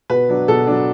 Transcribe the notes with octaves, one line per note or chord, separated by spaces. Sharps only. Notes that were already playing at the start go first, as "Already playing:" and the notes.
B2 B4
F#3 D4
B2 A4
F#3 D4